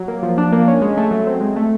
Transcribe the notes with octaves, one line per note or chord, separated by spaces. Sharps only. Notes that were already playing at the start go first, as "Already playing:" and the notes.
Already playing: F#3
A#3
F3
D4
A#3
C#4
G#3
A3
F#3
C4
G#3
A3